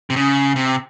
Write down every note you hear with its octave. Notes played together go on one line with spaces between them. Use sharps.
C3
C#3
C3